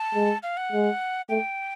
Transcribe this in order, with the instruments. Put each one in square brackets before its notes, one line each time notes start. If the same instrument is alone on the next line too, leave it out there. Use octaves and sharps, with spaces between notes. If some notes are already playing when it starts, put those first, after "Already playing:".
Already playing: [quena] A5
[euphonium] G#3
[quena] F5
F#5
[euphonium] G#3
[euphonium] A3 [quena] G5